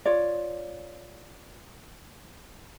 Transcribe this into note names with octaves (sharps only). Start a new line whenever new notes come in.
F4 C#5 D5